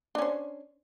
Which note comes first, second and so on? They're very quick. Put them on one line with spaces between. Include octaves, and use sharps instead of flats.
D4 C#4 C5